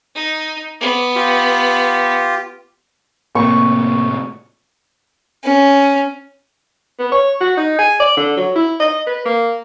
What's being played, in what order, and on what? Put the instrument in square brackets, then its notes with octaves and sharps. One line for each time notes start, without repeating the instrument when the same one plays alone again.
[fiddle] D#4
[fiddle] B3 [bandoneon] D6
[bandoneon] F4 G4
[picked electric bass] A2 C3 [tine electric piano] A#3 [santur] C#6
[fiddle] C#4
[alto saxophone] B3
C#5
F#4
D#4
G#5
D5
D3
F#3
E4
D#5
B4
A#3